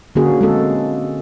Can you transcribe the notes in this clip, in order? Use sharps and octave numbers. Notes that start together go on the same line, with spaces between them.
D3 A#3 C#4 F#4 G#4
G#3 C4 A4